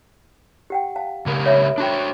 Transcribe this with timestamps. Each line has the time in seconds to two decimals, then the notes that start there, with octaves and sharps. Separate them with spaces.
0.70 G4 F#5 G5
0.96 F5 A5
1.26 C#3 G4 A#4
1.46 C#5 E5 B5
1.78 D4 F#4 G5 B5